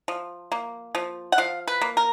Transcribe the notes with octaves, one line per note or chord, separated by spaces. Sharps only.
F3
A#3
F3
F#5
F3 F5
B4
A#3
A#4